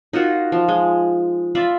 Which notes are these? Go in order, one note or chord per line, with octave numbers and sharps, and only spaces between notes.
D#4 F4 F#4 A#4
F3
G#3
F4 D5 E5 B5